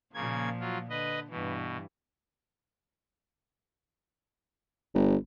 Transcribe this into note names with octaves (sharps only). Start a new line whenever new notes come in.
A#2 C#3 F3 A#3 G#6
F#3 F4
D3 B4 D#5
G2 B2 E3
G1